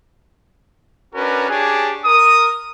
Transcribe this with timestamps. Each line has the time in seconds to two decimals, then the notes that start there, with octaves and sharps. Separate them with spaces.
1.15 C#4 D4 F#4 A#4 B4
1.49 D4 G4 G#4 C#5 G#5
2.05 A#4 D#6